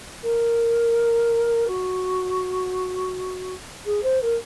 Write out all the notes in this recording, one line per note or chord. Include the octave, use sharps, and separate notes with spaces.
A#4
F#4
G#4
C5
A#4